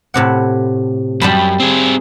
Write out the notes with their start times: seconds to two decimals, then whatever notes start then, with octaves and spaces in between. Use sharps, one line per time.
0.14 A2 C3 F#5
1.21 F#2 G3 A5 B5
1.60 C4 G#4